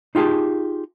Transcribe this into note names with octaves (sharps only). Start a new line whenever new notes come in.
D#4 F4 G4 G#4 A5